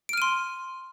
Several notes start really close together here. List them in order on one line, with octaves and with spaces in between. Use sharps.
D7 F6 D#7 C6